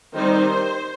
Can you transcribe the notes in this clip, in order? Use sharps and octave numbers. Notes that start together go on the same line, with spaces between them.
D#3 G3 C4 D#4 C5